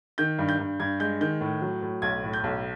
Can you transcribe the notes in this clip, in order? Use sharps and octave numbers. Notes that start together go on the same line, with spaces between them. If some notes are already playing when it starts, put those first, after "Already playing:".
D#3 G6
G2
G6
G2
G2 G#6
G#3 G6
D#3 G6
A2
F#3
A2
B1 G#6
A2
G6
B1